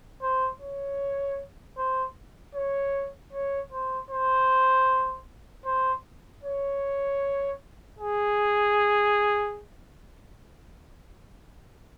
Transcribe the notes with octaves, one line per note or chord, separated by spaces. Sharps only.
C5
C#5
C5
C#5
C#5
C5
C5
C5
C#5
G#4